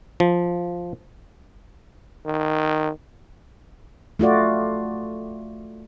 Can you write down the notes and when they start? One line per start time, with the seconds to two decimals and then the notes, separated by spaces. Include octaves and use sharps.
0.20 F3
2.26 D#3
4.19 A3 F4 F#4 D5